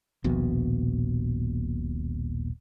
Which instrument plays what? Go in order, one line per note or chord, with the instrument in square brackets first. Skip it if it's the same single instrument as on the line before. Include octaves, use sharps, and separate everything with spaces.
[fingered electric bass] D#1 A#1 B2